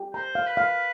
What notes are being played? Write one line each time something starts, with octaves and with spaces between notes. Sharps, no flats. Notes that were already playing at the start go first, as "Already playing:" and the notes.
Already playing: G4
C5 A#5
F5
B4
F5